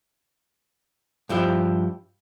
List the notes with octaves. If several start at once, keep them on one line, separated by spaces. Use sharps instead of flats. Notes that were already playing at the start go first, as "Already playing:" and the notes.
G2 F3 E4 G4